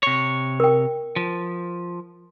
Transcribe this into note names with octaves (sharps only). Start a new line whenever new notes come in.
C3 C#5
A#4 G5
F3